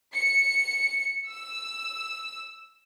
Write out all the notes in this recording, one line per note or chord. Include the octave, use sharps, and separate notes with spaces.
C#7
E6